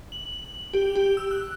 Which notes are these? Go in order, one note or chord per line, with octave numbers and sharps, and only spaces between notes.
F#7
G4
G4
E6
F#6